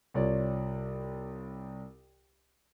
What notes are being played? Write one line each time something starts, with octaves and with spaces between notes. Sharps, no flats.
C2 F4 C#5 D5